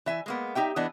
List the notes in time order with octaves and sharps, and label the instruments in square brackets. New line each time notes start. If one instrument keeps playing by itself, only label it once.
[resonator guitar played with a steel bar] E3 E5 G#5
G#3 A#3 B3
D#4 G4 E5 G5
E3 B3 D4 D#5